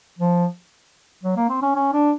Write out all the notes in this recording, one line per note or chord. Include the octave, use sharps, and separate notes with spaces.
F3
F#3
A#3
C4
C#4
C#4
D4